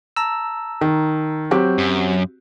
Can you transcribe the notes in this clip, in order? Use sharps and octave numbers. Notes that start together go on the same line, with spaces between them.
A5 A#5 E6
D#3
F#3 C4 F#4 G4
F#2